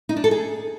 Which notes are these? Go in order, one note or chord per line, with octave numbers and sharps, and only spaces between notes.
D#4
D4
A4
G#4